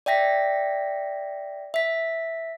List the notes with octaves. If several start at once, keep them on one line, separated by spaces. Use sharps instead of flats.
D5 E5 G5 A#6 B6
E5 B6